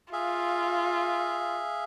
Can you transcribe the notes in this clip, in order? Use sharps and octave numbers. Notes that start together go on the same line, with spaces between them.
F4 G#4 E5 F5